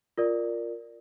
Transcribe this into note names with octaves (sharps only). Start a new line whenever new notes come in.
F4 A#4 D5